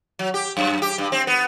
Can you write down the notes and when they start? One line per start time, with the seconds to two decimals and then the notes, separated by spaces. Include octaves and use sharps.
0.19 F#3
0.34 G4
0.57 F#2
0.82 G4
0.98 G2
1.12 C4
1.27 B3